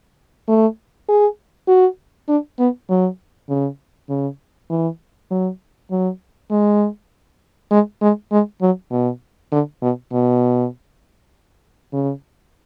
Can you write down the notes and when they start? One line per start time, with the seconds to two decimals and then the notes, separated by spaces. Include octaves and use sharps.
0.48 A3
1.09 G#4
1.68 F#4
2.28 D4
2.59 B3
2.89 F#3
3.49 C#3
4.09 C#3
4.70 E3
5.31 F#3
5.91 F#3
6.51 G#3
7.71 G#3
8.02 G#3
8.32 G#3
8.61 F#3
8.91 B2
9.52 D3
9.82 B2
10.13 B2
11.93 C#3